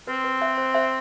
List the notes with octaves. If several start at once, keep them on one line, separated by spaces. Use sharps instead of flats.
C4 B4
B4
C5 E5
C5
C5 E5